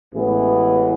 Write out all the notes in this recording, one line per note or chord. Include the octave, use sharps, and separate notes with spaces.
A1 A2 E3 G#3 B3